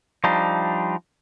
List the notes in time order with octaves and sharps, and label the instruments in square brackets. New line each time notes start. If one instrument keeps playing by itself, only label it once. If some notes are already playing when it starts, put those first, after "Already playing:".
[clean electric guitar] F3 G3 D4 D#4